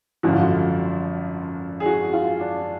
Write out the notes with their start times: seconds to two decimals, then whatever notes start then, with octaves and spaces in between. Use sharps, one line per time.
0.23 G#1 F#2 D3 F3 F#4
0.33 F4
0.42 F#4
1.80 G#4
1.86 F#4
2.13 F4
2.40 D4